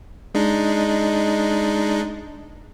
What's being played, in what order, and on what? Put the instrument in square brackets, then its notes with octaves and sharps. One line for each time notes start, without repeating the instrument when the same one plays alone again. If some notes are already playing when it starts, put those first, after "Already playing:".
[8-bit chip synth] G#3 D4 D#4